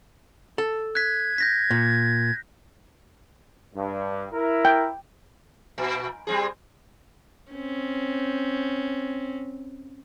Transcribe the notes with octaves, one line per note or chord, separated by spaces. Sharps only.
A4
F#6 G#6 B6
G6 A#6 B6
A#2
G2
E4 A#4
G5
A#2
G3 C4 G#4
C4 C#4